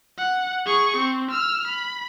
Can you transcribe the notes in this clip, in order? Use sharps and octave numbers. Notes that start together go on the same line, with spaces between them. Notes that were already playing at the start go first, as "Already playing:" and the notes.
F#5
G#4 C#6
C4
E6 F6
B5